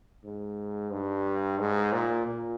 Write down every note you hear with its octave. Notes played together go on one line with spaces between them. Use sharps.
G#2
G2
G#2
A#2
A#2